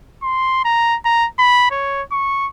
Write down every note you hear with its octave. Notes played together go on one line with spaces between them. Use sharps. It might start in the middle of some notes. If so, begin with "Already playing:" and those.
C6
A#5
A#5
B5
C#5
C#6